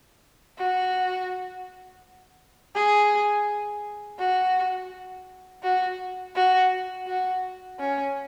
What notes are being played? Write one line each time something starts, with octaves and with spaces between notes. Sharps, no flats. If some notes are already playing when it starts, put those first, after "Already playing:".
F#4
G#4
F#4
F#4
F#4
F#4
C#4